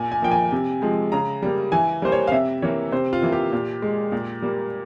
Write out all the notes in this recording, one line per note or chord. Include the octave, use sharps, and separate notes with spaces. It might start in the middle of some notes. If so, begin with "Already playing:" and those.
Already playing: A#2 G#5
G#5
F3 A#3 G5
G#5
C3
F3 G#3
C#3 A#5
G3 A#3
E3 G#5
G3 A#3 C5
C#5
F5
C3 E5
E3 A#3 C#5
C3 C5
F4
E3 A#3
G4
A#2
G#3
A#2
G3 A#3